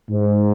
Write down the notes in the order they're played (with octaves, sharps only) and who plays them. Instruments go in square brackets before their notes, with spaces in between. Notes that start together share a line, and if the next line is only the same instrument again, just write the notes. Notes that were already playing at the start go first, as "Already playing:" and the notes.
[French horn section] G#2